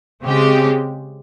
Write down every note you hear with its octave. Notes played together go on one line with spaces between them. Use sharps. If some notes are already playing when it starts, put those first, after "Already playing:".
C#3 G#3 C4 G4